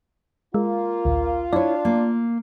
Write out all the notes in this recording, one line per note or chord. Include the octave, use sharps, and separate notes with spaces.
G#3 A#3 F4
A1 D2
D4 E4 C#5 D5
A#3